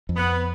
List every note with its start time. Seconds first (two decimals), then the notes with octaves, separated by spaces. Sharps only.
0.09 F2
0.17 B3